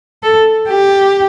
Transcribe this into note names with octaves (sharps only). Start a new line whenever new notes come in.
A4
G4